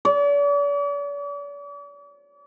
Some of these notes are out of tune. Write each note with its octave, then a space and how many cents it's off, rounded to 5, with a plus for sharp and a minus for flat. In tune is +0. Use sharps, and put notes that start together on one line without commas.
D5 -45